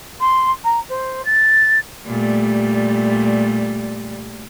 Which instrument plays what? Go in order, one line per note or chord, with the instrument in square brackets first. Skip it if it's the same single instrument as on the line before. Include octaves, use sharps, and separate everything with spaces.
[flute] C6
A#5
C5
A6
[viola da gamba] A#2 G3 A3